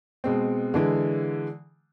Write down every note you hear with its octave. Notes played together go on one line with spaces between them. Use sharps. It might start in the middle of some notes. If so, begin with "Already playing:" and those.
B2 G#3 C4
D3 E3 G#3